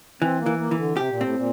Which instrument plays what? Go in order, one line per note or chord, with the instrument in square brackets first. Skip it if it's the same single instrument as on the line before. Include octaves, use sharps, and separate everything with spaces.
[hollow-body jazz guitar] E3 [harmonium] C4
[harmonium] A#3
[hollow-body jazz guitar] E3
[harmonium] A#3
[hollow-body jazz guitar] E3
[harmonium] D3
[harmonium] C3 [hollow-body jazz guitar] G4
[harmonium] A#2
[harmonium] A2 [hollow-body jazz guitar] C4
[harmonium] A#2